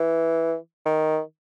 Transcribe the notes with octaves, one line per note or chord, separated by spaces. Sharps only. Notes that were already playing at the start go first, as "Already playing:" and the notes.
Already playing: E3
D#3